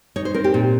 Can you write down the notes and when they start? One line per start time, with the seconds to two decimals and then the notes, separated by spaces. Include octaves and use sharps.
0.16 D#4 C#5
0.25 C5
0.34 C4 A#4
0.44 G4
0.54 A#2